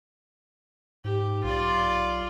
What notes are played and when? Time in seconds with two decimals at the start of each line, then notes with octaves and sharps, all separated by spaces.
1.04 G#2 G4
1.44 B1 F4 D5